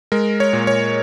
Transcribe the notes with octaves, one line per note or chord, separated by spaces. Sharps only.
G#3 A#4
C#5
A#2
C#5